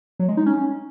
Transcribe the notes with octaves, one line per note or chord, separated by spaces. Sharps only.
F#3
G#3
D#4
C#4